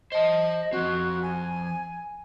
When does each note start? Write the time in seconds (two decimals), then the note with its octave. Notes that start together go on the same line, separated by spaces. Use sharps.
0.12 C5 D#5 A5
0.73 F3 C4 F#4
1.22 G#5